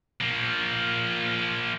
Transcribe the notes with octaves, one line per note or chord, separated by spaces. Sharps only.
F3 A#3